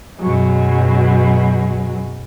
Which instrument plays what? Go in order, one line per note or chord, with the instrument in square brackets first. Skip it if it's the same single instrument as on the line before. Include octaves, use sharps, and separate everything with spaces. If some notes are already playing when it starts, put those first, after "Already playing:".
[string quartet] F#2 B2 F#3 G#3